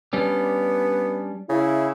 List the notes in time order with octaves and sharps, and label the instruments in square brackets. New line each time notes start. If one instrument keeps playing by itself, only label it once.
[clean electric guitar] G3 C#4 D4 [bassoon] B3
[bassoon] C#3 [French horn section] E4